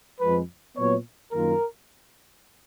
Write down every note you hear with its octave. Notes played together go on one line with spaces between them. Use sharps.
F2 F3 G#3 B4
A#2 F#3 B3 C#5
F#2 D#3 A#3 F4 A#4